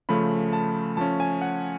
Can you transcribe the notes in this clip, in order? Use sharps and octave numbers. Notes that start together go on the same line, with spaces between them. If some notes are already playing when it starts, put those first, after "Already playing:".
C#3 F3 A3 C#4 B5
A5
F3 A3 C#4 A5
G#5
F#5